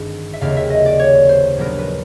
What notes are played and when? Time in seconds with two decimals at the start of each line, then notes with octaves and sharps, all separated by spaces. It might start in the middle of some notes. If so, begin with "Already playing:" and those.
Already playing: G#1 G2 D3
0.33 E5
0.41 F1 D#2 C#3 F5
0.57 E5
0.70 D#5
0.86 D5
0.99 C#5
1.29 C5
1.57 A#1 A#2 F#3 B3 A#4
1.78 B4